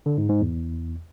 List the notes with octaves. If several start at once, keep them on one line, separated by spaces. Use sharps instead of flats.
D3
G#2
G#2
E2